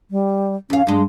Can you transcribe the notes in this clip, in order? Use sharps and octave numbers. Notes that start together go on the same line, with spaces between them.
G3
E2 C#4 F5
G2 G#3 D4